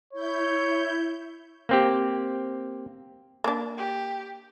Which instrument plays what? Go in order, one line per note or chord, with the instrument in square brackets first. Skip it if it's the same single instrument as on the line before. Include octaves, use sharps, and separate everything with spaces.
[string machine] E4 G6 [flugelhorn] C#5
[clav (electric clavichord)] A#3 C4 G4
[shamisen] A#3 D4
[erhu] G4